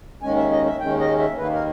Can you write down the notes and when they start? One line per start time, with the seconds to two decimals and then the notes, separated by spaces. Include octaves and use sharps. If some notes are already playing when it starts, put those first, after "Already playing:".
0.22 D#2 D#3 G#3 C#4 G#5
0.37 E5
0.51 D#5
0.66 E5
0.80 D#2 D#3 G#3 C#4 G5
0.99 D#5
1.19 E5
1.38 D#2 D#3 A#3 B4
1.53 A#4